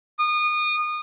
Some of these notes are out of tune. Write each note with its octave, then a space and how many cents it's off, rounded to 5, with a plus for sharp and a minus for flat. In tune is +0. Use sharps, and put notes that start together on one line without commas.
D#6 -30